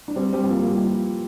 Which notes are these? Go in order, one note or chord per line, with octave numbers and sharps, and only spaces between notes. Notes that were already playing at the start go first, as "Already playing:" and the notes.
D4
G3 C4
G3 C4
C4
F3 A#3
A#3
G3
F3